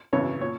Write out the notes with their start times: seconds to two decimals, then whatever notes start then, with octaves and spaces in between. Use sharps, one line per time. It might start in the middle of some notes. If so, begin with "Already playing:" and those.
0.13 G#1 F#2 C#3 E3 C#5
0.41 A#2 C#5